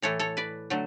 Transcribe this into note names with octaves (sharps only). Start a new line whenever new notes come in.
A2 E3 A3 A4 C#5
A4 C#5
B4 D5
D3 F#3 A3